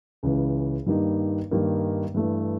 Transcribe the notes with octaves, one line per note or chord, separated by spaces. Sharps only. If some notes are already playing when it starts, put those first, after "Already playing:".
C#2 C#3 E3
G2 D#3 G3 A#3 D#4
G2 D#3 G3 A#3 D#4
G2 E3 A3